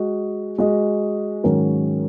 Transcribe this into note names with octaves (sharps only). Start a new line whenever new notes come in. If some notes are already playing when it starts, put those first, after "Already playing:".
Already playing: G#3 F#4 D#5
G#3 F#4 D#5
G#2 D#3 F#3 C#4 A#4